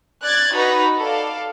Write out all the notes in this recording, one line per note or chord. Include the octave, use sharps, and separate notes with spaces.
D5 F#6 G#6 A6
D#4 F#4 B4 A#5
A4 D5 F5